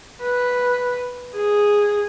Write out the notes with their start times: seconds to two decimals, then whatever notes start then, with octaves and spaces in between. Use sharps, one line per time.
0.23 B4
1.36 G#4